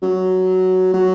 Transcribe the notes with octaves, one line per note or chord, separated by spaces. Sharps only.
F#3
F#3